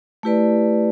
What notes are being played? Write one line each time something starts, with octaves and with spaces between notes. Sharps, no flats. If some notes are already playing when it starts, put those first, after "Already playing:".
A3 E4 G4 B4 D5